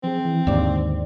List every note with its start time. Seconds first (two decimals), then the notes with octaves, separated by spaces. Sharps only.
0.04 F3 C4 G#4
0.25 E3
0.47 D#2 G#2 D3 D5